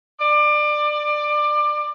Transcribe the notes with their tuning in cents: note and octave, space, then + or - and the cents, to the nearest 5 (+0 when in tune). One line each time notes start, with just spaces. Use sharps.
D5 +25